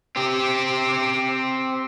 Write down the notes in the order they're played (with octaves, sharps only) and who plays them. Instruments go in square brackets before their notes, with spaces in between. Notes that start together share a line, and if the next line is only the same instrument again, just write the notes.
[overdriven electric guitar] C4 G4